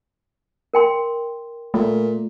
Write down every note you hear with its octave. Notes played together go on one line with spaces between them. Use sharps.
A#4 G5 C6
A#2 A3